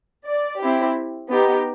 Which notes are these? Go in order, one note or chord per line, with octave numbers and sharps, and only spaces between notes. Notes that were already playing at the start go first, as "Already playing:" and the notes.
D5
C4 E4 G4
B3 D#4 G4